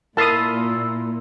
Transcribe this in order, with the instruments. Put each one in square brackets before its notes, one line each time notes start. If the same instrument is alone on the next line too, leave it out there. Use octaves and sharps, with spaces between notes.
[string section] A#2 [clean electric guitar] E4 F4 F5 [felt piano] A#4 [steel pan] A5 D#6